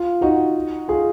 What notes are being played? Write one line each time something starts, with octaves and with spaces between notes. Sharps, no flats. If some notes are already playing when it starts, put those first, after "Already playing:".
Already playing: F4
D#4 F#4
F4 G#4